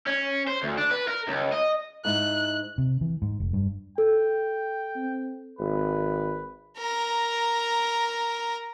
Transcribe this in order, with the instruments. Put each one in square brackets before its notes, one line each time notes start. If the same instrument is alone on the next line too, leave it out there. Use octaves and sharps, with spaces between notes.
[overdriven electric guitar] C#4
C5
D2
D4
B4
A#4
C#2
D#5
[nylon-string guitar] G#2 D#4 E4 [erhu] F#6
[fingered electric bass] C3
E3
G#2
F1
G2
[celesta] A4 [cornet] G5
[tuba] C4
[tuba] G#1 [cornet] B4
[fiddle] A#4 A#5